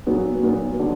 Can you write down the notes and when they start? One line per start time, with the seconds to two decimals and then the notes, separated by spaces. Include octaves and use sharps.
0.07 A#2 F#3 B3
0.43 A#2 F#3 B3
0.79 D3 F#3